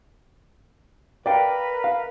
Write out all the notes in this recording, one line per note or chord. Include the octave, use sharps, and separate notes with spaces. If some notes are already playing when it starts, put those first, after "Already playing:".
A#4 B4 D5 F5 G5
F5